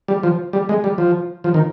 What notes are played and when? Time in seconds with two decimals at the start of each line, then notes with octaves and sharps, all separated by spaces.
0.08 G3
0.23 F3
0.53 G3
0.69 G#3
0.84 G3
0.98 F3
1.44 F3
1.54 D#3